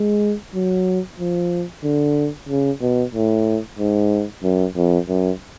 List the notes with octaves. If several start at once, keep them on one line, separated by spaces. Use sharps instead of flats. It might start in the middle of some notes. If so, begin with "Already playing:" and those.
Already playing: G#3
F#3
F3
D3
C#3
B2
A2
G#2
F#2
F2
F#2